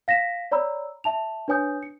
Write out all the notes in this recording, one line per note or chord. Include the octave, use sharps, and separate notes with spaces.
F5 A#6 B6 E7
C#5 D5 A#5 B5 E6
E5 A5 F7
D4 B4 C#5 G#5 D#6 G6
C#7